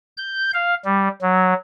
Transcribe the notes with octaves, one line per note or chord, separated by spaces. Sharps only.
G6
F5
G3
F#3